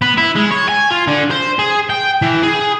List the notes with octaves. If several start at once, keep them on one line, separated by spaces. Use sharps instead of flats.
B3
E4
G#3
C#5
G#5
F4
D3
C5
G#4
G5
E3
G#4